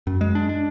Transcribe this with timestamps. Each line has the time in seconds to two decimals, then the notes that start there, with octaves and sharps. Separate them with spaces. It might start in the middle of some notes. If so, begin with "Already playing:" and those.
0.07 F#2
0.21 G#3
0.35 D4
0.49 D4